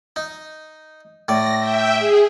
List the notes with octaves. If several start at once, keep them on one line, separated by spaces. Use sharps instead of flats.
D#4
A2 D5 A#6
E5 G5
G#4